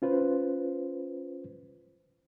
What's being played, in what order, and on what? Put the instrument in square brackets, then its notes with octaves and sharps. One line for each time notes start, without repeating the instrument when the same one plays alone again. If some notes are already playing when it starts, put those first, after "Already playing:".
[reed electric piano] C#4 F4 B4 C5